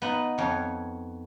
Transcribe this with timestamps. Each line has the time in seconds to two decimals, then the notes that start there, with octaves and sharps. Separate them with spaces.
0.02 B3 D#4
0.38 F2 C#5